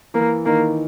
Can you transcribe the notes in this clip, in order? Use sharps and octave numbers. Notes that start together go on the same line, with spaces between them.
E3 A#3
D#3 A#3